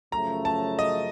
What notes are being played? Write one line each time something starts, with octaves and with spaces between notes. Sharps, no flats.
F#2 C#3 F3 A3 A#5
A5
D#5